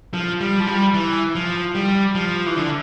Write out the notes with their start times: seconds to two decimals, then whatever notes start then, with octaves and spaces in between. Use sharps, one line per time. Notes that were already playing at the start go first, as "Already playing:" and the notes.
0.14 F3
0.41 G3
0.60 F3
0.67 G3
0.94 E3
1.35 F3
1.75 G3
2.15 F3
2.46 E3
2.56 D3